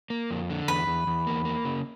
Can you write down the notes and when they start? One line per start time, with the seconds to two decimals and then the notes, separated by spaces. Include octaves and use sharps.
0.10 A#3
0.31 F2
0.50 D3
0.68 E2 B4
0.87 E2
1.07 E2
1.27 A#3
1.45 A#3
1.65 C#3